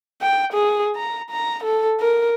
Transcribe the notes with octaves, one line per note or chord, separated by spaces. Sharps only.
G5
G#4
A#5
A#5
A4
A#4